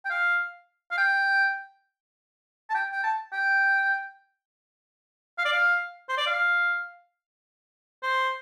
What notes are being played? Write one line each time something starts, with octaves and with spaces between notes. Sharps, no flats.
G5
F5
F5
G5
A5
G5
G5
A5
G5
F5
D5
F5
C5
D5
F5
C5